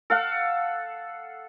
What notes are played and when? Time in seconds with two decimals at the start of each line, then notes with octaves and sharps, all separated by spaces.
0.10 A4 F5 F#5